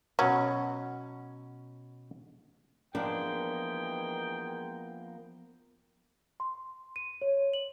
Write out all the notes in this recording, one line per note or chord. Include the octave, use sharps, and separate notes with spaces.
B2 F#3 C#4
E3 F3 G#3 A#3 B3 D4 G5
C6
D#7
C#5
F#7